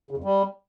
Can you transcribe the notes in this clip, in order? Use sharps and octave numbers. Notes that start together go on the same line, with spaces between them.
C#3
F2
G3